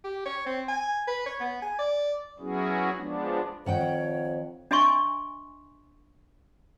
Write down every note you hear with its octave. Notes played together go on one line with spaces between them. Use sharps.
G4
C#5
C4
G#5
B4
C#5
B3
G#5
D5
F#3 B3 C#4 E4 F#4 G#4
F3 G#3 B3 D4
F2 D#3 C#5 F#5 G5
D4 D#5 E5 G#5 C6 C#6